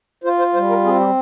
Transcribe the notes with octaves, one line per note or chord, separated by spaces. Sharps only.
F4 C5
C5
G3 C5
A#4
C4 G#4
G4